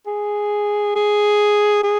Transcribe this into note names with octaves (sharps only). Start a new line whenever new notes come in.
G#4
G#4
G#4